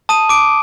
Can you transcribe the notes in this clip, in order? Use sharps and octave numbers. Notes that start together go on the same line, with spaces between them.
A5 D#6 D#7
D6 D7